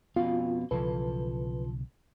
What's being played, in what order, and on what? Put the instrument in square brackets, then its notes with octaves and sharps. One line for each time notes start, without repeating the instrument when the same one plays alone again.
[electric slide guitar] F2 B2 F5 [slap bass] B3 C#4 [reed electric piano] F4
[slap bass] B1 C#3 E3 [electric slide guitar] F3 A4 [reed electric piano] B4